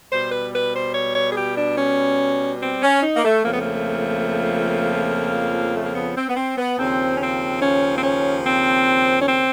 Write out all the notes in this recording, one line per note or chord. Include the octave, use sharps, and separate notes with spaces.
B2 G3 C5
B4
B4
C5
C#5
C#5
G#4
G4
D4
C#4
C4
C#4
D#4
A#3
A3
F2 C#3 F3 A3 A#3
B3
A#3
A3
A#3
B3
C4
B3
C4
B3
D#2 C#3 F3 C4
C#4
C4
C#4
C4
C#4
C4
C#4
C4